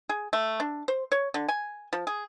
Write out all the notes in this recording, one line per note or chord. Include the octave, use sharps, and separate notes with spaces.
G#4
A3
D4
C5
C#5
D3
G#5
F3
G#4